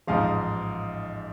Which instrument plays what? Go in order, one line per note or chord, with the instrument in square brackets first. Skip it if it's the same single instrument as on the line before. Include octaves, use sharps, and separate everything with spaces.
[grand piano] A1 G#2 F3 G#3 D#5 F5